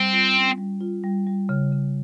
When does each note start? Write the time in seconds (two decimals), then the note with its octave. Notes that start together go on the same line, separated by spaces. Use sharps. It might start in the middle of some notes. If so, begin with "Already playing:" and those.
Already playing: G3 C4
0.12 F4
0.35 C#4
0.58 G3
0.81 F4
1.04 G3
1.27 G3
1.49 C#3
1.72 C#3